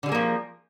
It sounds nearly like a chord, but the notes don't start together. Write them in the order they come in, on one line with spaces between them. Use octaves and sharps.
D3 G3 G#3 A#3 F3